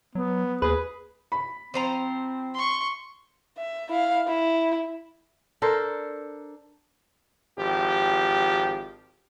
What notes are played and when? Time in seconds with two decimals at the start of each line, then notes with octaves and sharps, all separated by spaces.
0.15 F#3 B3
0.62 D#2 G#4 B4
1.32 B5
1.74 F3 C4 C5 A#5
2.54 C6 C#6
3.58 E5
3.89 E4 F5
4.27 E4
5.62 D4 A4 A#4 C5
7.58 G#1 F3 G4